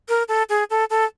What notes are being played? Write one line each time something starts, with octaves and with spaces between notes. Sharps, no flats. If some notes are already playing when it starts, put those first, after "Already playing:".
A#4
A4
G#4
A4
A4